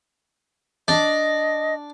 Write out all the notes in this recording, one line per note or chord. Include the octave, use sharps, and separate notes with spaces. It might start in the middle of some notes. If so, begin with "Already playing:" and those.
D4 D#5